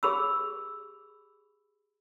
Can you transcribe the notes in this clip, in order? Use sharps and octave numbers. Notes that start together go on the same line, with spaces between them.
G4 G#4 B5 E6